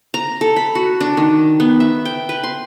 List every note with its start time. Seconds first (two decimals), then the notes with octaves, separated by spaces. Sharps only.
0.14 A#5
0.41 A4
0.56 B5
0.75 F#4
1.00 D4
1.17 D#3
1.60 B3
1.80 E5
2.05 G5
2.29 B4
2.43 C6